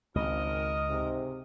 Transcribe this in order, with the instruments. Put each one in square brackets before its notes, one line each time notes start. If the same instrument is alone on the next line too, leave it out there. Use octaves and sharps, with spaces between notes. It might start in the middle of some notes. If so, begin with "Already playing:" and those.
[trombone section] G#1 [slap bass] C#2 [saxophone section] A#4 D#5
[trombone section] G#2 C3